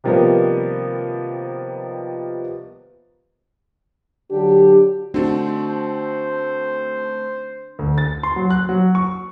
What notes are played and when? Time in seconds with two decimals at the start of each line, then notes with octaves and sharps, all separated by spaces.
0.04 C3 D#3 F3 G3 A#3 B3
4.31 D3 F#3 D4 G4
5.14 A3 C4 D4 D#4 F#4 C5
7.79 D2
7.98 A6
8.23 C6
8.36 F#3
8.50 F#6
8.69 F#3
8.95 C#6